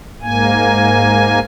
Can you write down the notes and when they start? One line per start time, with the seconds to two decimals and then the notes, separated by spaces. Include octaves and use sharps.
0.22 G#2 A#3 G#5